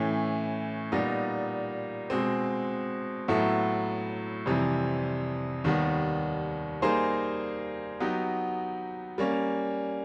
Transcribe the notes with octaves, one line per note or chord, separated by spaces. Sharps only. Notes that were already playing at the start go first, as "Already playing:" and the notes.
Already playing: A2 E3 A3 C#4
A#2 G3 B3 D#4
B2 G#3 C4
A2 F#3 B3 E4 A4
F2 C3 E3 G3
D#2 D#3 G3 B3
G3 A#3 D#4 G#4 C5
F#3 B3 D#4 G4
G3 A#3 C#4